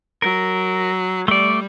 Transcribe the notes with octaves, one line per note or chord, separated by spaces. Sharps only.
F#3 A#4
G3 A3 D5